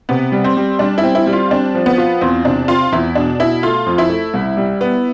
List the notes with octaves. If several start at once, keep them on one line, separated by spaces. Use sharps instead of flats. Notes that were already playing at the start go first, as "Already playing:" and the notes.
C3 B3
G3
C4
G3
G3 D4
E4
C4
E4
G3
F4
C4 D4
F3
B3
F4
E2 C4
C3 D4
C4 F4
E2 E4
B2 D4
B2 E4
A3 F4
F2
E4
A3
C2
G3
B3